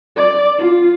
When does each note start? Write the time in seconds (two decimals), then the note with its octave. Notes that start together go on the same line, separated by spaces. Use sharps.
0.17 D5
0.58 F4